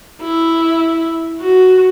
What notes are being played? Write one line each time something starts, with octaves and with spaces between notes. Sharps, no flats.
E4
F#4